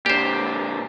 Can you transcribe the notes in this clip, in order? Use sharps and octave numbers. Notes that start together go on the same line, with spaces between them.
A#2 D3 G4 C5